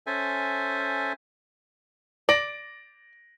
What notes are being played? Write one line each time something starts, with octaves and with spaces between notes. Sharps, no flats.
C#4 A4 C5 E5 G#5
D5 A#6 D7 F#7